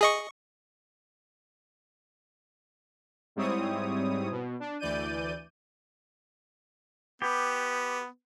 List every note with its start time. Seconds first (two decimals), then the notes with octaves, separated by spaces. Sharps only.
0.01 G#4 D#5 C#6
3.36 G#2 G3 C4 E4 C#5 D#6
4.31 B2
4.60 D4
4.79 D2 E3 D5 G6 D#7
7.22 B3 G4